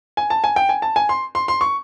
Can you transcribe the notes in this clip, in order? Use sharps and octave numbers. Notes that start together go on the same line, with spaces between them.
G#5
A5
G#5
G5
G#5
A5
G#5
C6
C6
C6
C#6